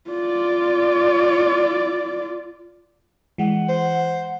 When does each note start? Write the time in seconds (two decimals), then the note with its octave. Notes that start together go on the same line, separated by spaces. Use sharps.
0.10 F4 D5
3.38 E3 G#3 F#5
3.69 C5